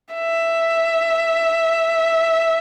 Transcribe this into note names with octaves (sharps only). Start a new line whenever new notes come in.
E5